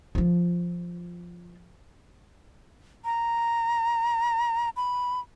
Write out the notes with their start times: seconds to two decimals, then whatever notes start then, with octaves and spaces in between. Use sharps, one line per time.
0.15 F3 F4
3.05 A#5
4.76 B5